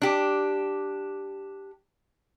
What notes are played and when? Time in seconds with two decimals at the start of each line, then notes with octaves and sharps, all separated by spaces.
0.02 D4 G4